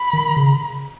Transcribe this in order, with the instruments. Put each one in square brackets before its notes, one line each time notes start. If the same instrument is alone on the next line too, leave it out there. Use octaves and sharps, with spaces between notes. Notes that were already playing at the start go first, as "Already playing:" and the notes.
Already playing: [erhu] B5
[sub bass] D#3
C#3